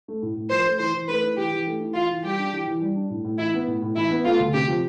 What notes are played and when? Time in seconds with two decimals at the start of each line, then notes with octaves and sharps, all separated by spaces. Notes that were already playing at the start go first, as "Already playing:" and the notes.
0.08 A3
0.22 A2
0.36 A2
0.51 F3 C5
0.65 A3
0.79 E3 C5
0.94 E3
1.08 A3 B4
1.23 E4
1.37 E3 G4
1.51 E3
1.66 A3
1.80 E4
1.94 E3 F4
2.10 E3
2.23 G3 G4
2.39 D4
2.53 E3
2.67 E3
2.82 G3
2.96 D4
3.10 A2
3.25 A2
3.38 E3 E4
3.54 B3
3.67 A2
3.82 A2
3.96 E3 E4
4.11 B3
4.25 A3 F4
4.40 D2
4.54 C3 G4
4.68 F3